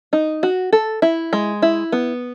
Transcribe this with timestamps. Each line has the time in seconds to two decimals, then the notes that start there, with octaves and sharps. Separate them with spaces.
0.13 D#4
0.43 F#4
0.72 A4
1.02 E4
1.33 G#3
1.62 E4
1.92 B3